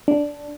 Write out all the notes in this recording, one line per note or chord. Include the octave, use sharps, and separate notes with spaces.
D4